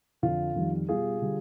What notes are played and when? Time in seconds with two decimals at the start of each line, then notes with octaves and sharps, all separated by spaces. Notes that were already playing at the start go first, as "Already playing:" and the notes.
0.22 F2 D3 F3 F4
0.55 F2 D#3 G3
0.89 B2 G3 F4 G#4
1.22 D3 G3